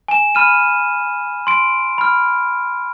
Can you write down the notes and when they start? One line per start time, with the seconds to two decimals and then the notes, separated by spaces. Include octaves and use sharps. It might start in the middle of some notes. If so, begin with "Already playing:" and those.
0.08 G#5 E7
0.35 B5 F6 D#7
1.47 C6 D7
1.98 B5 F6